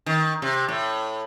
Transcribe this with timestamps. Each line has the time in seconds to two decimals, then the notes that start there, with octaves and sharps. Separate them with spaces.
0.06 D#3
0.42 C3
0.68 A2